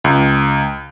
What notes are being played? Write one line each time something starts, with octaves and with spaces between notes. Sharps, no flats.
C#2